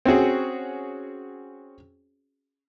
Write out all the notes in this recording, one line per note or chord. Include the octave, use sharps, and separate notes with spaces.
C4 C#4 F#4 G#4